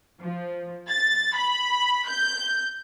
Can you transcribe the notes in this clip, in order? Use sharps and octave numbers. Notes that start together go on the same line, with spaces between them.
F3
A6
B5
G6